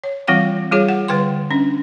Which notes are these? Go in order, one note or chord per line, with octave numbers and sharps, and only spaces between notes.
C#5
E3 G3 C4 F4 F#5 G5
G3 F4 G#4 C#5
F#5
D3 G3 B4 G5 C6
C#4 D4